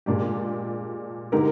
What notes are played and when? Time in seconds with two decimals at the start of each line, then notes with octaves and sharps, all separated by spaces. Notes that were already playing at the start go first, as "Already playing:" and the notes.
0.06 A#2 G#3 D4 G4
1.32 D3 G#3 D#4 G4 A#4